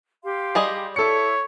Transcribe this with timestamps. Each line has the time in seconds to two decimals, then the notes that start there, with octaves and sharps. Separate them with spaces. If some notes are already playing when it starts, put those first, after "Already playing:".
0.24 G4 F5 C6
0.55 G3 G#4 D#5
0.96 E4 A4 C#5 C#7